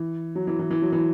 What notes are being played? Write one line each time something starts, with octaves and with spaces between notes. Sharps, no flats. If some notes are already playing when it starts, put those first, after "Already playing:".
Already playing: E3
F#3
E3
E3
E3
F#3
E3